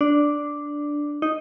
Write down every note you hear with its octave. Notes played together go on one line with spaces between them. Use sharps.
D4
D#4